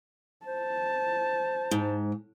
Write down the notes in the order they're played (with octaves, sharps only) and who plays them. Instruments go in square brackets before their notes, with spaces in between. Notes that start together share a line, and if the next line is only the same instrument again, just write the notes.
[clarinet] C5 [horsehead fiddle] A5
[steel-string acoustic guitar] G#2